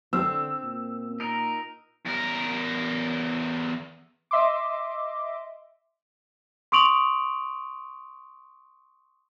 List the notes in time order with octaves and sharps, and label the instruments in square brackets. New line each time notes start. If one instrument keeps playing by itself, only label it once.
[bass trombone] D3 [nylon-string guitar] C4 [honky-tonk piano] E6
[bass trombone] A#2
[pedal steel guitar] D#4 A#4
[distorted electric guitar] E2 A#4
[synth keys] D#5 E5 C6 D6
[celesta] C6 C#6 D#6 D7 F7 F#7